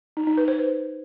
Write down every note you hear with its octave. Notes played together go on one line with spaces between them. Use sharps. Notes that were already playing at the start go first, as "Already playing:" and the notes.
D#4
D#4
B4
C5